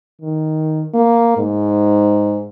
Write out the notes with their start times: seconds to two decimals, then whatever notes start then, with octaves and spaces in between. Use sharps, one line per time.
0.21 D#3
0.94 A#3
1.38 G#2